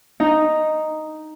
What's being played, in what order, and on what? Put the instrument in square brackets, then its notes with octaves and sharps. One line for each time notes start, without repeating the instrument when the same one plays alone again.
[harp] D#4